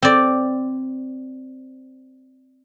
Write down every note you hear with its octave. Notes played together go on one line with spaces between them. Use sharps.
C4 D5